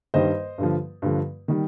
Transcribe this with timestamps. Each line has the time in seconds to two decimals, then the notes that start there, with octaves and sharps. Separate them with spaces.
0.14 G2 D#3 G3 C5 D#5
0.58 G2 D3 F3
1.02 G2 D3 F3
1.48 D#3 G3